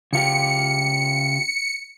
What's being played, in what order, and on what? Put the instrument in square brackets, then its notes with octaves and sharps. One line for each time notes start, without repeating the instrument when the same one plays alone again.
[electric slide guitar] C#3 F4 G4 [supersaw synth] C#7